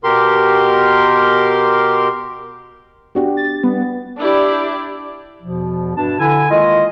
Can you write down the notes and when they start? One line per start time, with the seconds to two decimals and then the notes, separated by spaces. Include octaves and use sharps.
0.04 B2 G4 A#4 C6
3.15 B3 D4 F#4 G4
3.37 A6
3.63 G3 B3
4.18 D4 E4 G4 D5
5.42 E2 B2 F3
5.96 G2 B2 D4 A5
6.20 D3 E4 G#5
6.51 D#3 G#3 A#3 F4 D#5